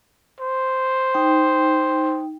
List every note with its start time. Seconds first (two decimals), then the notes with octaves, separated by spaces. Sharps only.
0.40 C5
1.14 D#4 G5